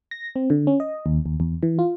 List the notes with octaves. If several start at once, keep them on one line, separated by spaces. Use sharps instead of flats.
A#6
C4
D3
C#4
D#5
D#2
D#2
E2
E3
F4